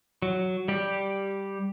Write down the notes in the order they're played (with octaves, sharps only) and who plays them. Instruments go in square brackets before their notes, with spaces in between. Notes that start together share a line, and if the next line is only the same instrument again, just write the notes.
[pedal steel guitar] F#3
G3 G4